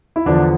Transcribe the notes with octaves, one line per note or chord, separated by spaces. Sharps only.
E4
E2 D3 F3 D4